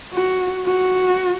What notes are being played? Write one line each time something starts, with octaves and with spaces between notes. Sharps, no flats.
F#4
F#4